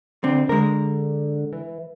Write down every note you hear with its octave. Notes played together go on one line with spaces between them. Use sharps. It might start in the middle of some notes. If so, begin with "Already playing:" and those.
D3 C4
D3 G#3 A#4
E3